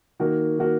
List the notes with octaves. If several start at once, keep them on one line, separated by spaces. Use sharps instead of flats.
D#3 A#3 F#4 A#4
D#3 A#3 F#4 A#4